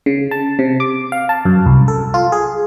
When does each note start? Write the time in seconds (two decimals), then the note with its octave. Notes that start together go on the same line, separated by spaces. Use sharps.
0.06 C#3
0.31 A5
0.59 C3
0.80 D6
1.12 F5
1.29 A5
1.45 F#2
1.66 C2
1.88 A4
2.14 F4
2.32 G#4